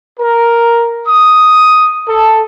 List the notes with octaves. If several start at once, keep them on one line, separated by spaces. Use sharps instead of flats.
A#4
D#6
A4